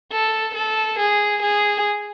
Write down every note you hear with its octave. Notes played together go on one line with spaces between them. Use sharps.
A4
A4
G#4
G#4